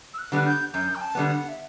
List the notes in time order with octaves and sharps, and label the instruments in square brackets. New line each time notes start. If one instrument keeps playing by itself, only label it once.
[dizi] E6
F#6
[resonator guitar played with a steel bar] D3 G3 B3
[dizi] G6
[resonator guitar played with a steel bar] F#2 [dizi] G6
[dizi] G5
A5
[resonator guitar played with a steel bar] D3 G3 B3
[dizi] F#5
E5